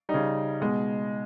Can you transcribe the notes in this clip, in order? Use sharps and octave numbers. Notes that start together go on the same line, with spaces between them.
G3 D#4
C#3
B2 G#3